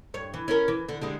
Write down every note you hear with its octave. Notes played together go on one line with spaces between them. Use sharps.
G2 C#5
E3
C#4 E4 A#4
E3
D3
D3 G3 G#3